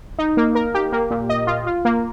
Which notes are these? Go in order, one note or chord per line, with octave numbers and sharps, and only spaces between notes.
D#4
A#3
A#4
G4
A#3
A#2
D#5
F4
F4
A#3